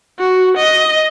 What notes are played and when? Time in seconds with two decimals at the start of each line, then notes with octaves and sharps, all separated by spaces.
0.19 F#4
0.57 D#5